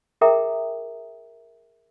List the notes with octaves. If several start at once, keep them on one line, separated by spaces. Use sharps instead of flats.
G#4 A#4 E5 G5 A#5 D#6